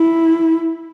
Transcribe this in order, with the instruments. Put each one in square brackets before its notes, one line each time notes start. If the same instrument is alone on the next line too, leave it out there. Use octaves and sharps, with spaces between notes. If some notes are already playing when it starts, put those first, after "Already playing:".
Already playing: [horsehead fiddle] E4